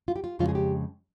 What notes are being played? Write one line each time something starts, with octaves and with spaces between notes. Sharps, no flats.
F4
G4
F4
F2 C#3 G#3 F4
G#4
G4